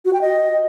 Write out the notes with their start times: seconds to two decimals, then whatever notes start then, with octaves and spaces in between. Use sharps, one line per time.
0.05 F#4
0.13 G5
0.21 D#5